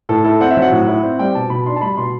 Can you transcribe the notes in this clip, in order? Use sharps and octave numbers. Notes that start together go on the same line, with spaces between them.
A2 A4
E4 A4
C4 F#5
E5
F#3
F#5
A2
E4
C4
G3 G5
B2 A5
B2 B5
D4 C6
A5
G3 B5
B2 C6